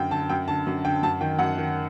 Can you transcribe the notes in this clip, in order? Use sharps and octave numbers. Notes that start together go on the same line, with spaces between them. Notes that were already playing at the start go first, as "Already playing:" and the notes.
Already playing: F#2 D3 G5
D3 A5
F#2 G5
D3 A5
F#2
D3 G5
F#2 A5
D#3 G5
F#2 F#5
D#3